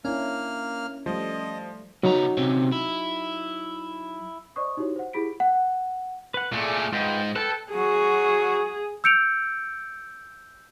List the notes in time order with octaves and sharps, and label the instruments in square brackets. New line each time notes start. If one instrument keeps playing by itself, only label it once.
[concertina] A#3 F6 [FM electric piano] C#4 [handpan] D4 E4
[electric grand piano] F3 [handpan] G3 A3 [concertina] D#5
[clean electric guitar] C#3 B3 A#5 [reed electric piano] F#3 D#4
[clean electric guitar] C3 C4 C#4
E4
[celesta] C5 D5 D#5 C#6 D#6
D#4 E4 F#4 G4 C#5
C5 F#5
E4 G4 G#4 B5 B6 D7
F#5
[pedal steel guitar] B4 F#5
[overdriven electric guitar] A#2 A3 [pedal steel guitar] G#4 D5
[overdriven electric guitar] G#2 [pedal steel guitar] F4 B4 G5
[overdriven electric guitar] A4 [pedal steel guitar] B4 G5 A5
[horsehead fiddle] F#3 F#4 [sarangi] G#4
[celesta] E6 G6 C#7 D7 F7